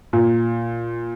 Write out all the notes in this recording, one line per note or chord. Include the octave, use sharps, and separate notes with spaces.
A#2